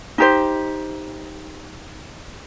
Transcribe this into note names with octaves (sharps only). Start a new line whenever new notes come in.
D#4 G4 C5